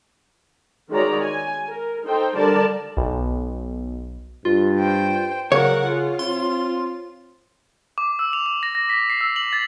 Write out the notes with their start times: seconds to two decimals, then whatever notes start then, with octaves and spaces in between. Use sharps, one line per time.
0.91 D#3 G#3 F#4 C#5 D5 A#5
1.23 G#5
1.66 A#4
2.04 D#4 A4 C5 G5
2.37 D3 G3 A#4 D5 A5
2.97 B1
4.45 G2 F4
4.79 C5 G5
5.52 C#3 F#3 A#4 C#5 F#5
5.88 F4 G#4
6.19 C4 C6
7.98 D6
8.19 E6
8.33 F7
8.46 F7
8.63 A#6
8.75 A#6
8.89 B6
9.10 C7
9.21 E6
9.36 F#7
9.53 A6